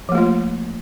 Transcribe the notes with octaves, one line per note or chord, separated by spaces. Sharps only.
F3 A3 A#3 F4